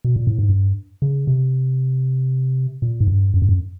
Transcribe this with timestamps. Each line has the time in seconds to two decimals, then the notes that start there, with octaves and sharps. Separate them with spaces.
0.04 B2
0.16 A#2
0.27 A2
0.39 G#2
0.49 G2
1.02 C#3
1.27 C3
2.82 A#2
3.01 G#2
3.08 G2
3.34 F#2
3.42 G2
3.49 F#2